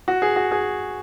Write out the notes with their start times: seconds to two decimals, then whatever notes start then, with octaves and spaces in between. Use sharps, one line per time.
0.08 F#4
0.22 G#4
0.36 F#4
0.52 G#4